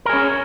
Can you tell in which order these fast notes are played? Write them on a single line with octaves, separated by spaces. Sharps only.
A#4 G#4 C#4